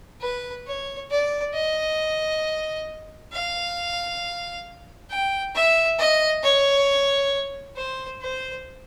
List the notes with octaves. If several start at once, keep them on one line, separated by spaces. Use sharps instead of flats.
B4
C#5
D5
D#5
F5
G5
E5
D#5
C#5
C5
C5